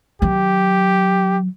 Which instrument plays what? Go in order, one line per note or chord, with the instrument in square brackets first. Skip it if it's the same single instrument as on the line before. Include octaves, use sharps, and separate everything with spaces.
[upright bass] D#3 F#3 [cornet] G4